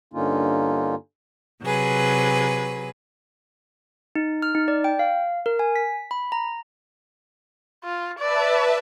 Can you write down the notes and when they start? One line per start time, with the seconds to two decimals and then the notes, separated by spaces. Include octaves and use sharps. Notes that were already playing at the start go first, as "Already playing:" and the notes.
0.13 G2 D3 A#3 C#4 D#4 F4
1.63 C3 F#3 G#4 B4
4.16 D#4
4.42 F6
4.55 D#4
4.68 D5
4.84 G5
4.99 F5
5.46 A#4
5.59 G#5
5.76 B6
6.11 B5
6.32 A#5
7.84 F4
8.19 B4 D5 E5 A5